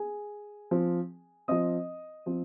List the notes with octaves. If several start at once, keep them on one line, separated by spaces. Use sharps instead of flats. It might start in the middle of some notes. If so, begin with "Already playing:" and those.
Already playing: G#4 G#5
F3 C4
F3 C4 D#5 D#6
F3 C4